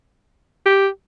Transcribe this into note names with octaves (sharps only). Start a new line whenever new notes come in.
G4